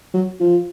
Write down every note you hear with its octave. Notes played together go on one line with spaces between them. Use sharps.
F#3
F3